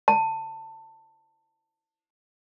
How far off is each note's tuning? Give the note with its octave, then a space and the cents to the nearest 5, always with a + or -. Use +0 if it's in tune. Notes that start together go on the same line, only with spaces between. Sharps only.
A5 +20